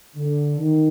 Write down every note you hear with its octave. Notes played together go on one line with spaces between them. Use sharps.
D3
D#3